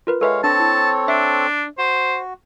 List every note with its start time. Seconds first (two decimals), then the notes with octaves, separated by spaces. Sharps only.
0.07 F4 A#4 B4
0.21 G#3 A4 B4 C#5 E5 F5
0.44 C4 D4 A4 C#5 A5 A#6
0.60 E4
1.08 D4 E5
1.78 F#4 C5